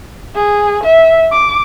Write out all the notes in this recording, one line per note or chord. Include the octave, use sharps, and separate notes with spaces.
G#4
E5
D6